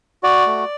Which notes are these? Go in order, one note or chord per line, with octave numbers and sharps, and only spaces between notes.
F#4 D5
A3